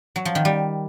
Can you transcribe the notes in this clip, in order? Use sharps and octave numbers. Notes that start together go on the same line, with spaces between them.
F#3
F3
D#3
G3